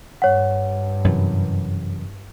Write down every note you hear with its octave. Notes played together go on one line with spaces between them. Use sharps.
G2 C#5 F#5
F#2 C3 E3